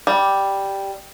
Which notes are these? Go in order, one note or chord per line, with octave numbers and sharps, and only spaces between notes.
G3